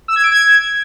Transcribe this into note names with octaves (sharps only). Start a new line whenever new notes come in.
E6
G#6
D7
G#6